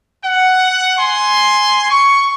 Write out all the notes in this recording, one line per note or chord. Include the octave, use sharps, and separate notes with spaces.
F#5
G#5 C6
C#6